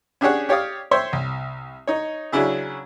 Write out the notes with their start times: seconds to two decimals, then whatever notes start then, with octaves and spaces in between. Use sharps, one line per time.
0.21 C#4 D4 G4 G#4 C#5 F#5
0.49 G4 C#5 D5 F5 D#6
0.91 C5 C#5 E5 G5 C6
1.13 C2
1.88 D#4 C#5
2.32 C#3 F#3 C#4 D4 E4 G#4